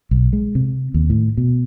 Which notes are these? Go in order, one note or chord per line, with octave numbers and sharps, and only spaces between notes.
B1
G#3
C3
D#2
A2
B2